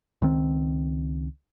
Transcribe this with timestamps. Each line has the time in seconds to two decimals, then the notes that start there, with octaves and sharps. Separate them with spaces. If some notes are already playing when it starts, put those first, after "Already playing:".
0.22 C#2 D#3 C4